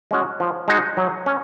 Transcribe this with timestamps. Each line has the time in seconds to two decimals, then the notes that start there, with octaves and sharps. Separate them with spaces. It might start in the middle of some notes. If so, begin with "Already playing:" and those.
0.11 G#3 C#4 F#4
0.40 F3
0.68 G#3 D#4 F#4
0.97 F#3
1.26 C#4